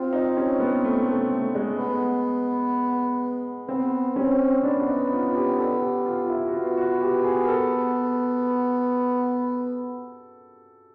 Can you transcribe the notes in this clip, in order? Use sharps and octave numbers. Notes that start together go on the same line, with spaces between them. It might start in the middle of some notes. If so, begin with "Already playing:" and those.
Already playing: C4 F4
D#4
C#4
B3
A3
A3
A3
G#3
B3
B3 C4
C4 C#4
B3 D4
D4
D#4
F4
G4
A4
G4
F4
E4
F#4
B3 F4
F#4
G4
G#4
A#4
A4